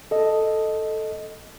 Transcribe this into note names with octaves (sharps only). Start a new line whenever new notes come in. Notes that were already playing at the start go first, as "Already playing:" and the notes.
A4 D#5